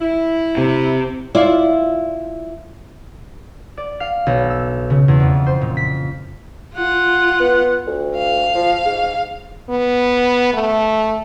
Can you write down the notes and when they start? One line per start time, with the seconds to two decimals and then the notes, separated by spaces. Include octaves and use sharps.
0.01 E4
0.58 C3
1.35 E4 F4 D5
3.77 D5
4.00 F5
4.26 B1
4.50 E6
4.90 C#3
5.08 E2
5.20 F2
5.47 C5
5.61 A#2
5.77 B6
6.74 F4 F#5
7.40 B3
7.87 D2
8.16 F5
8.55 F3
8.85 G#2
9.69 B3
10.53 A3